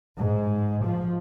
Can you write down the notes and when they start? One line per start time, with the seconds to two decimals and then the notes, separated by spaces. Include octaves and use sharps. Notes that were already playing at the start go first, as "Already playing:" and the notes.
0.18 G#2
0.84 F3